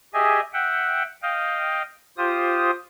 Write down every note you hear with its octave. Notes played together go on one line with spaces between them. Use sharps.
G4 G#4 D#5 E5 G#5
E5 F#5 G5
D#5 F5 G5
F4 G4 C5 D#6